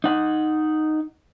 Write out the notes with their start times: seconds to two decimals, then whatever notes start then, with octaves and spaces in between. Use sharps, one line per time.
0.04 D#4 F#5